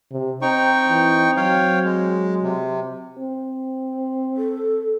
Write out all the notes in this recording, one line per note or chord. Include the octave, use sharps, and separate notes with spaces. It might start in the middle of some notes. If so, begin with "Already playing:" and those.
C3
C4 D#4 G5 C#6
E3
F#3 C#5 F5 G5
G#3
C3
C4
A4